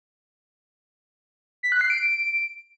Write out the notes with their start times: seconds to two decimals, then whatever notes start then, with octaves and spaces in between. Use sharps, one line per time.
1.63 B6
1.72 F#6
1.81 C7
1.90 D7